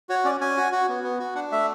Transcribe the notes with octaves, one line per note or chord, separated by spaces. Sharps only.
F#4 C#5
C#4 D5
C#4 G#5
F#4
F#4
B3
B3
F#4
D4 F#5
A3 E5